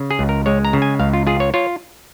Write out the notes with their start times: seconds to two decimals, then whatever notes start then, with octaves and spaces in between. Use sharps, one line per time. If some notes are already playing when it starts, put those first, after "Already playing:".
Already playing: C#3
0.11 G#4
0.19 C#2
0.29 A#4
0.46 G#3 C#5
0.65 A#5
0.73 C#3
0.82 G#5
0.99 C#2 F5
1.13 F4
1.27 F4 G#4
1.40 C#5
1.54 F4 C#5